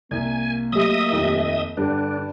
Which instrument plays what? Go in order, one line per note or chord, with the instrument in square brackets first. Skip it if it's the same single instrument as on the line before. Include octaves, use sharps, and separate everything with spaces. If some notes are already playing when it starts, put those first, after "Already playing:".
[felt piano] C2 [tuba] A#3 [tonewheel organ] G#5
[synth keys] F#3 A3 G4 [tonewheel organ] D#5 E5 D#6
[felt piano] D#1 F2
[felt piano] G2 [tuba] D3 [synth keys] G3 [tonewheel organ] D4